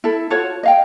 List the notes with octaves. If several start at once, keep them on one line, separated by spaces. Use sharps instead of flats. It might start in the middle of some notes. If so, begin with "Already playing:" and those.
E4 A4
F4 F#4 A4 C#5
D#5 F5 G5